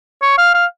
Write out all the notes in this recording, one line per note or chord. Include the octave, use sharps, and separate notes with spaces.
C#5
F5
F5